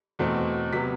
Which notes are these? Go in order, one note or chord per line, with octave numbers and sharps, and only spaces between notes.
E2 B2 A3 C4
C3 F#3 B3 B6